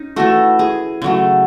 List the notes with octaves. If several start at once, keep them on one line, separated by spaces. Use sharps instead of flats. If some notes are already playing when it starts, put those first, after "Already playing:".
Already playing: C#4 D#4
E3 A3 F#4
G#4
C#3 F#3 A3